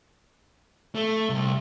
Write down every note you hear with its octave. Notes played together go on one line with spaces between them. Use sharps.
A3
C2